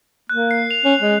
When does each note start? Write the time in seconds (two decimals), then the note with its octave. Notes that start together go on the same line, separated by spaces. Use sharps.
0.29 A#3 F#6
0.51 C7
0.71 F7
0.85 C#4
1.00 G#3